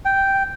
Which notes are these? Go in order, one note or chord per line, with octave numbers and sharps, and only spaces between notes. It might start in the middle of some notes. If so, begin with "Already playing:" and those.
G5